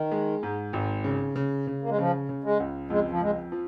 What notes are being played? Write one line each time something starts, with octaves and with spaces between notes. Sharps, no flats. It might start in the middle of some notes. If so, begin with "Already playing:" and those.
Already playing: D#3
G#3
G#2
G#1
C#3
C#3
C#3
A#3
G#3
C#3 F3
C#3
G#3
C#2
F2 G#3
F3
F2 G#3
F3